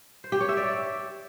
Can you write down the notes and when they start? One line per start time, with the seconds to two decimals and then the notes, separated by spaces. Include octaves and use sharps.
0.24 C5
0.32 G4
0.40 C#5
0.49 E5
0.57 D5